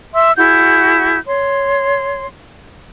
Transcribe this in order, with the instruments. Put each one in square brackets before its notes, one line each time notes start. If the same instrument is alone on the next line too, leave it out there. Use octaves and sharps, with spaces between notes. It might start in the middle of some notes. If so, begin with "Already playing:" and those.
[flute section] E5 C6 E6
E4 F#4 G#4 G6
C#5 C6